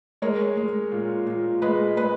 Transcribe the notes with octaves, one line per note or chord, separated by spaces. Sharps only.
G#3 A#4 C#5
G#3
A#2
A#2
G#3 B4 D#5
G#3 B4 D#5